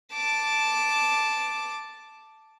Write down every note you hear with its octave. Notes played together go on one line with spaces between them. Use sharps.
A5 D6